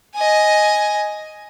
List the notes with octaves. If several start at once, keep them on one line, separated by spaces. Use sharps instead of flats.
D#5 G#5